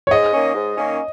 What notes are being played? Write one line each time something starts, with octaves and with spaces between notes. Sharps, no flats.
C#5
G#2 D#5
D#3 A#3 C#4
G#2
D#3 A#3 C#4